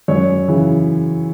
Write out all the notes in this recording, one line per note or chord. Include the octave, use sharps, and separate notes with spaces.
F#2 C#5
C#3 E3